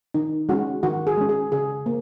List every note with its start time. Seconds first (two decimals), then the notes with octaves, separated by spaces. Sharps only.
0.14 D#3 D#4
0.49 G#3 C#4 F#4
0.83 D#3 F#4
1.07 G#4
1.17 G#3 C#4
1.29 G#4
1.52 C#3 G#4
1.86 A#3